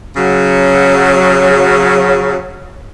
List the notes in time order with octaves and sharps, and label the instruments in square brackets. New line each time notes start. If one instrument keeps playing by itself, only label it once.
[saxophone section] C#3 F#3